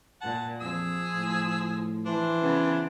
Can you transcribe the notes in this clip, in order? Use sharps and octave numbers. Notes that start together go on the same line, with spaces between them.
A#2 F#5 A5
F2 F3 G#4 E6
A2
E3 D4 C5
C#3 B3 C#4